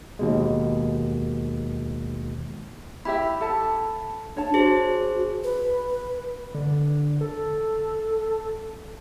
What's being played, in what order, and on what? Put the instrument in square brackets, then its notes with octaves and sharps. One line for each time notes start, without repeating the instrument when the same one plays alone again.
[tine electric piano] D#2 B2 G#3
[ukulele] E4 G4 E5 [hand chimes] B5
[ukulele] A4 A5
[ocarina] D4 [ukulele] C#5 A5
[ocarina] F#4 [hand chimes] G#4 C5
[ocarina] B4
[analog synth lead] D3
A4